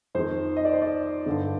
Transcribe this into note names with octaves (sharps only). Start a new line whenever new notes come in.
F2 D#3 C5
D#5
D5
C5
D5
G2 D3